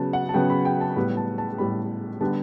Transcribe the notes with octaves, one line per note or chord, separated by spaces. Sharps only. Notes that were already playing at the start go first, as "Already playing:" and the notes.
Already playing: C#3 F#3 B3 A5
F#5
A5
C#3 F#3 B3 G5
B5
G5
A5
A2 G3 B3 B5
A5
A5
A2 G3 B3 B5
D3 G3 B3 A5